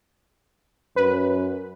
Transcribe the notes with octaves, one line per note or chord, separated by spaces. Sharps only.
F#2 B4